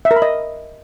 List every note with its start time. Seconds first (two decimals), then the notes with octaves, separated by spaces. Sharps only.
0.05 E5
0.11 A#4
0.16 B5
0.22 D#5